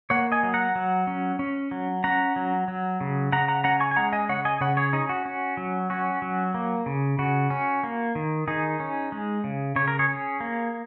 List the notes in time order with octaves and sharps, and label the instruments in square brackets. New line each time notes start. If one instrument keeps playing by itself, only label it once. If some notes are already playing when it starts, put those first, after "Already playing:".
[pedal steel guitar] A#3 C#5 F#5
D#5 G#5
F#3
F#5 A#5
F#3
C#4
C#4
F#3
C#4 F#5 A#5
F#3
F#3
C#3
C#3 F#5 A#5
F#5 A#5
C#4 F#5 A#5
G#5 C#6
G#5
G#3 F#5 A#5
D#5 G#5
C#3 C#5 F#5
D#5 G#5
C#3 C#5 F#5
G#4 C#5
C#4 D#4 G#4
F#4
C#4
F#3
C#4 F#4
F#3
A#3
C#3
C#3 F#4
C#4
A#3
D#3
D#3 D#4 G#4
C#4
G#3
C#3
C#3 C#5
A#4
G#4 C#5
C#4
A#3